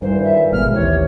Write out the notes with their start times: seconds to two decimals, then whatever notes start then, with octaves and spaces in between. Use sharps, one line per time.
0.02 D2 G2 A#2 D#3 E3 C5
0.23 E5
0.52 G#1 B2 G#3 F6
0.73 A1 D#2 C3 E3 C#5